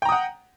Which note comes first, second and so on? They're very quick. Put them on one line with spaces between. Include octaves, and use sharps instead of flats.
G5 A#5 D#6 F#5